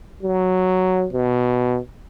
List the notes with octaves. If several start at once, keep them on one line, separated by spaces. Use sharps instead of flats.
F#3
B2